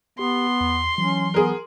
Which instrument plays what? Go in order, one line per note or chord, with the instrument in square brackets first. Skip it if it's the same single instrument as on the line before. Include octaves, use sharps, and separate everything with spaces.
[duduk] B3 [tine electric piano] G4 [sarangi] C6
[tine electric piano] E2
[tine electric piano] E3 F#3 [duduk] C#4
[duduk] B3 [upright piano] G#4 A#4